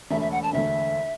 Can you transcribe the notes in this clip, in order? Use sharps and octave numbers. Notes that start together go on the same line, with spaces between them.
E1 D2 D3 A3 E5
E5
F#5
A5
E1 D2 D3 A3 E5